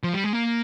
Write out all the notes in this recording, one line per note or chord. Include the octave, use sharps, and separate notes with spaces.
F3
G3
G#3
A#3